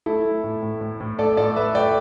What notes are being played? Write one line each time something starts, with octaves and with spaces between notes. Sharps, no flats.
A3 E4 A4
A3
A2
A2
A2
A2
A3 A4 D5
A2 A4 D5
A3 B4 E5
A3 D5 G5